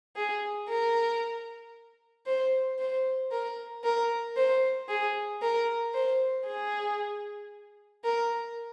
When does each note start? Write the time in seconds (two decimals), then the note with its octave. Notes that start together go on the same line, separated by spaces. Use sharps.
0.16 G#4
0.69 A#4
2.26 C5
2.79 C5
3.31 A#4
3.84 A#4
4.36 C5
4.89 G#4
5.42 A#4
5.94 C5
6.47 G#4
8.04 A#4